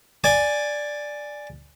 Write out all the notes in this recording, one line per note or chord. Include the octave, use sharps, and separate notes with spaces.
D5 G#5